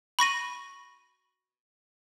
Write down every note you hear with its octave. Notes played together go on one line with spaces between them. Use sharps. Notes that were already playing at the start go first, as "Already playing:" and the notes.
B5 C#6 A#6 D#7